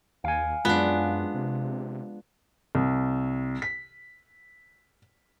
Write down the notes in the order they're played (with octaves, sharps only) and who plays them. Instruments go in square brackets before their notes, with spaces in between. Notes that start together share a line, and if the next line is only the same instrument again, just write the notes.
[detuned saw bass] D#2 [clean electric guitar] F5 G#5
[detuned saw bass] F#2 [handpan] G#3 F4 [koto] B3 D4
[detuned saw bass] C3
[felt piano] C2
B6